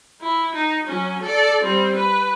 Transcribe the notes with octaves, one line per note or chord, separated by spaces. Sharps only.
E4
D#4
F#3 C#4
A4 D5
G3 C4
B4